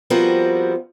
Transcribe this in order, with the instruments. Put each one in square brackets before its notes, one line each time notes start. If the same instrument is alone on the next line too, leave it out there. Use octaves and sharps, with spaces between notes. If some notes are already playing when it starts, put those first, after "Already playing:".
[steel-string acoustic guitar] F3 G3 B3 C4 F#4 A#4